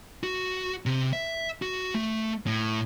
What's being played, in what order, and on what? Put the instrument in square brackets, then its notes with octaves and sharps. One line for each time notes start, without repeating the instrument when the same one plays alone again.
[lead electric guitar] F#4
C3
E5
F#4
A3
A2